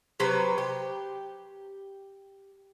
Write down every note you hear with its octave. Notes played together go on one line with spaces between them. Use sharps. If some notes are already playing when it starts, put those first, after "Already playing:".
C3 F#3 B4 C5
G4